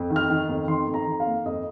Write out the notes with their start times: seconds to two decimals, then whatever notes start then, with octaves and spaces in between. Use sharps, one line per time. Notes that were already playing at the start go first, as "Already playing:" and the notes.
Already playing: F2
0.10 D#3
0.16 F6
0.30 D#3
0.49 F2
0.68 D#3 C6
0.87 F2
0.94 A#5
1.06 D#3
1.20 F5
1.26 A#3
1.46 F2 D#5